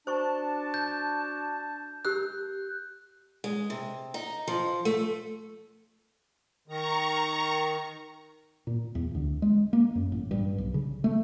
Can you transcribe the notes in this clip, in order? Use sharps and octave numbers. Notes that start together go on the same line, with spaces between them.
D4 F#4 C5 A5 C#6
G6
G4 A#4 E6 F#6
G#3
C3
D#4
F3
A3
D#3 A#5 C#6
A#2
E2
D2
G#3
A#3
F#2
A1
G2
B1
C#3
A3